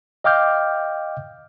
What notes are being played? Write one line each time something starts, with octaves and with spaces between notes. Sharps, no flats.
D#5 F5 G5 D6 F6 G6